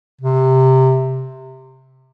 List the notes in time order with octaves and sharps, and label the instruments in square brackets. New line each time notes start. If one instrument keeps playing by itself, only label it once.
[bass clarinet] C3